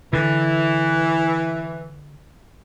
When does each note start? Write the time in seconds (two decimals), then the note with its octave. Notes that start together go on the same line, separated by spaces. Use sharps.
0.13 D3 E3